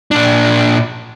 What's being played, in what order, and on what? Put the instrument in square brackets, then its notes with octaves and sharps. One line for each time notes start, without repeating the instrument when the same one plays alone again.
[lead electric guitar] A#2 D4